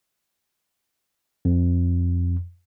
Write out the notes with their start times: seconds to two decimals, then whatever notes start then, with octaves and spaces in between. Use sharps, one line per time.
1.45 F2